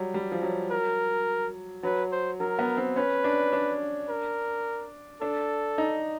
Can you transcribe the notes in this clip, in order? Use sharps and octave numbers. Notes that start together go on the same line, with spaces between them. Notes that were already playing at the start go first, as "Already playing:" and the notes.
Already playing: F#3 G3
G3
F3
F#3
A#4
F#3 B4
C5
F#3 A#4
B3
C4
C#4 B4
D4
D4
A#4
D4 A4
D#4